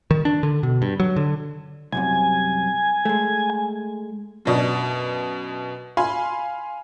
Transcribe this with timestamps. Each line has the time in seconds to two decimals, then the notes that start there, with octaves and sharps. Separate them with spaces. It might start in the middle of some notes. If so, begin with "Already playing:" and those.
0.11 D#3
0.25 D4
0.43 D3
0.63 B2
0.82 G2
1.00 F#3
1.16 D3
1.93 C2 F#2 C3 G#5
3.05 G#3 A3
4.45 F#2 B2 D4
5.97 F5 G#5 B5 C6